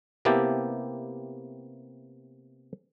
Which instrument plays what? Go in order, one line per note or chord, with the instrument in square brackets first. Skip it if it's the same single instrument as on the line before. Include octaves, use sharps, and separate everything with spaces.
[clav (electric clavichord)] C3 A#3 B3 E4 G4 A5